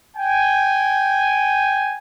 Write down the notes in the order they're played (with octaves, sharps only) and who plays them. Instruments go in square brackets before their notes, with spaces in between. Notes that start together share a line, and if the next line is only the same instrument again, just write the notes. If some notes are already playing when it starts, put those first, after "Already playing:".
[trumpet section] G5 G#5